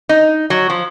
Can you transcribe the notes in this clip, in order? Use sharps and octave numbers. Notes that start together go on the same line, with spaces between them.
D#4
F#3
F3